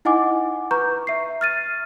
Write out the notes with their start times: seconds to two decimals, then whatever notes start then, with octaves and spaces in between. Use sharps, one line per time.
0.05 D#4 E4 D#5 F#5 G#5 D6
0.71 B4 A#5 C#6 G6
1.07 E5 C7
1.41 F6 A6 D#7